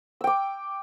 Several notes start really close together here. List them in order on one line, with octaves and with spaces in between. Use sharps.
E6 G5 D6